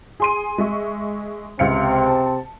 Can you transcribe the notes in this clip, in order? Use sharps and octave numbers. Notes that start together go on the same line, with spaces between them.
G#4 C6 D#7
G#3 E5 C#6
C#2 C3 C4 F5 C#7
A5